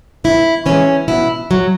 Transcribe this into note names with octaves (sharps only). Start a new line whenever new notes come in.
E2 E4
E3 G#3 C#4
B2 E4
F#3